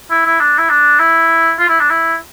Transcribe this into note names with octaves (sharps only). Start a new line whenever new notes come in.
E4
E4
D4
E4
D4
E4
F4
E4
D4
E4